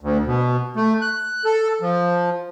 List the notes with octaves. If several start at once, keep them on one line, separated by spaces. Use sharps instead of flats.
D2
B2
A3
F#6
A4
F3